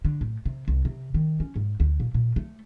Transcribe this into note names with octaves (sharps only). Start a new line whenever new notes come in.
D3
A2
C3
C2
C3
D#3
C#4
G#2
D2
A#2
A#2
A3